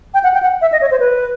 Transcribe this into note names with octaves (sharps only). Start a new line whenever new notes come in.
G5
F#5
G5
F#5
E5
D#5
C#5
C5
B4